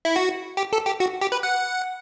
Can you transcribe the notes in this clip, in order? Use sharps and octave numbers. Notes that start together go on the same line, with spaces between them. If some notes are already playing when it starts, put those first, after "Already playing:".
E4
F#4
G4
A4
G4
F#4
G4
B4
F#5